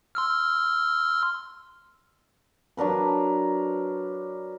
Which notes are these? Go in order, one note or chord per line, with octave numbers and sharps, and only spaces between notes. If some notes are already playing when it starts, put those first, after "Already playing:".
C6 E6 F6
F#3 D4 A#4 B4